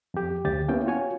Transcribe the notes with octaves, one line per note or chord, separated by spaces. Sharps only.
F2 G4
D2 G4 A6
A#3 B3 C#4 E4 G5
F4 F#4 C#5 G#5 C#6